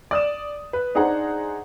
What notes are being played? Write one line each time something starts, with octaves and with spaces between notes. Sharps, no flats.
D5 D#6 E7
B4
D4 D#4 G#4 C5 F#5 A#5